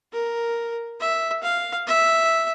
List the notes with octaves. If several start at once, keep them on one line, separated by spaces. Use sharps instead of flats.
A#4
E5
F5
E5